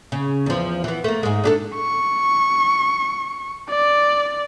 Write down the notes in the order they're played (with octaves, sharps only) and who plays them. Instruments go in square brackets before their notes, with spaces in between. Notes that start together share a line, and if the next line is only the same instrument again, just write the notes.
[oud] C#3
E2 F3
E3 B3
A3 A#3
G#2 G#3
D4 G4 A4
[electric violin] C#6
D5